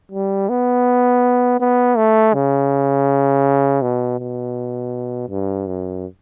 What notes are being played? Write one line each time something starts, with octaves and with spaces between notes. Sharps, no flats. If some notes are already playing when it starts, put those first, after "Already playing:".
G3
B3
B3
A3
C#3
B2
B2
G2
F#2